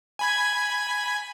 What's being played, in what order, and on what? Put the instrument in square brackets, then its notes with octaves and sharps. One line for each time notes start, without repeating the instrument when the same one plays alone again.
[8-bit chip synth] G#5 B5 G#6